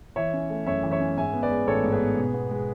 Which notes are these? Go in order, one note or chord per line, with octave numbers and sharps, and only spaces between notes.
E3 C#5 E5
C#4
A3
F#2 C#5 E5
E3
C#5 E5
C#4
G#2 E5 G#5
B3
B4 D5
G#3
A1 A4 C#5
G#2
G#4 B4
B3
B2
B3
G#3